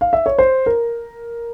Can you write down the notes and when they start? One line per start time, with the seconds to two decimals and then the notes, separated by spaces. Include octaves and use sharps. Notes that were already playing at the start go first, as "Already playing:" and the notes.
0.01 F5
0.13 E5
0.26 C#5
0.38 C5
0.66 A#4